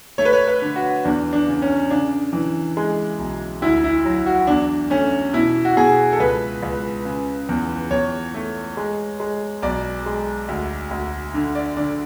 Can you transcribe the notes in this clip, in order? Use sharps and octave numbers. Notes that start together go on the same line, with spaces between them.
A3 C#5
B4
C#5
B4
D3
F#4
E2 D4
D4
C#3
C#4
C#3 D4
E3
G#3
B1
D2 E4
E4
F#3
F#4
E2 D4
A3 C#4
B2 E4
F#4
B2 G#4
A4
C#2 B4
C#2
C#3
E2
E2 C#5
A3
G#3
G#3
B1 D5
G#3
D2
D2
D3
D5
D3 D5